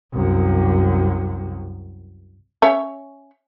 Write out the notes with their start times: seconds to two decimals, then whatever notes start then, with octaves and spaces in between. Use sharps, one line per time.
0.13 C2 F#2
2.62 C#4 C#5 E5